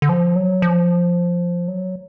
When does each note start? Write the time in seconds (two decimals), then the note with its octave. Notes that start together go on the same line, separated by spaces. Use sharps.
0.02 D3
0.09 F3
0.36 F#3
0.62 F3
1.68 F#3